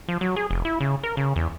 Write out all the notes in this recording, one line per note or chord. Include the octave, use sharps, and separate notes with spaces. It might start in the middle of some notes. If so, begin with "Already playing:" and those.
F3
F#3
G#4
F1
E4
C#3
A#4
C#3
E2